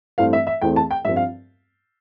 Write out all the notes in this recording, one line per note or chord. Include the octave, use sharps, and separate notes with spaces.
G2 E3 A3 C4 F5
E5
E5
E2 E3 A3 C4 G5
A5
G5
G2 F3 C4 E5
F5